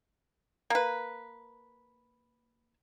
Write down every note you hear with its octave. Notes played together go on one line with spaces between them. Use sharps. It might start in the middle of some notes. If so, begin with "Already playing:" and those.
A#3 B4